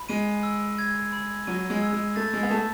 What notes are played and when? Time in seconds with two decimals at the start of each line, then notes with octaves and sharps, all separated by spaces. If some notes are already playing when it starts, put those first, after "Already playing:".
Already playing: B5
0.09 G#3 D#7
0.43 E6
0.78 G#6
1.13 B5
1.47 F#3 D#7
1.70 G#3
1.82 E6
1.92 G#3
2.16 A3 A6
2.33 G#3
2.43 B3
2.51 A3 A5